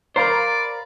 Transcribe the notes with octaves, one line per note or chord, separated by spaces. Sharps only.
A#4 C5 D5 F5 A#5 B5